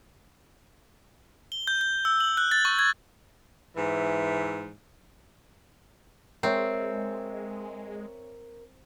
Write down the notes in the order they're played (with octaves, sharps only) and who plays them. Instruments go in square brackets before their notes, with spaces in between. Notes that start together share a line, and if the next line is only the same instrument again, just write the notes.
[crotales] G7
G6
G6
E6
F#7
F#6
A6
C#6
G#6
[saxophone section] G#2 E3
[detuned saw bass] G#3 [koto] C4 [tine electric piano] A#4 [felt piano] C#5 E5